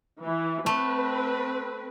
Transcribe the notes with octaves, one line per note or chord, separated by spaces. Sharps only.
E3
A3 C4 B4